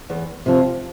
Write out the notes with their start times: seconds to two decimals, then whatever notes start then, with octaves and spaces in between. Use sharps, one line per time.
0.10 E2
0.46 C3 F3